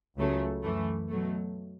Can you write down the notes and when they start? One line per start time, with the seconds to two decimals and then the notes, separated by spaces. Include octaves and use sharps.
0.17 C#2 C#3 F#3 A3
0.62 F#2 E3 A3
1.09 B2 F#3 A3